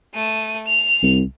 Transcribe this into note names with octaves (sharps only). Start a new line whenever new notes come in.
A3 D#7
F7
C2